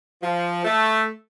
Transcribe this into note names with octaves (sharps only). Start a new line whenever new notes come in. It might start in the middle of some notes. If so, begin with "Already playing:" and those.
F3
A3